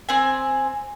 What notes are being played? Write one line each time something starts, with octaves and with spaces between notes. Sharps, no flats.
C4 G#5